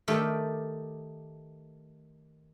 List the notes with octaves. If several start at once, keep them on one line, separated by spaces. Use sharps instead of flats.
D#3 A3 G4 D5